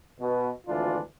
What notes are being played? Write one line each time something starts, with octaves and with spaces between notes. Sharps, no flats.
B2
G#1 D2 E3 D4 F4